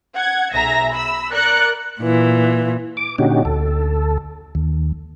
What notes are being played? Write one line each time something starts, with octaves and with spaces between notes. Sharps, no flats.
F#5 G#6
B1 G#4 E5 A#5 A#6
B5 E6
A#4 D5 F#6 C#7
A#2 E3
D6
A#2 D3 C#4 D#4 F#4 G4
D2 A4
D#2